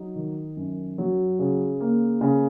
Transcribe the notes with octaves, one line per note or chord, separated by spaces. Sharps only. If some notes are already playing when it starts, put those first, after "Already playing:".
Already playing: F#3 D#4
D#3
F#2
F#3
C#3
A#3
C#3